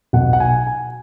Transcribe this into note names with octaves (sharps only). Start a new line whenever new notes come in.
B1 B2 F#5
F#5
G#5
G#5